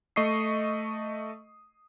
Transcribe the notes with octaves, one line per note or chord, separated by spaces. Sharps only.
A3 D#5 C#6 D#6 C7